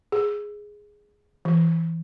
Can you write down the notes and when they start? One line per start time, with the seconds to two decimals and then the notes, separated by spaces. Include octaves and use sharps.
0.12 G#4
1.45 E3